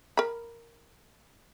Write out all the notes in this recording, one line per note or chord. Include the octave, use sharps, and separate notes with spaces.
A#4 B5